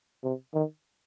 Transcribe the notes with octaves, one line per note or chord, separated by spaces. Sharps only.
C3
D#3